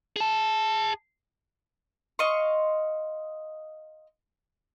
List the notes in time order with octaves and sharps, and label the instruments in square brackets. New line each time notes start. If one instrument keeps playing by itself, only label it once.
[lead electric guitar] G#4 A5
[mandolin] D#5 F5 C6 C#6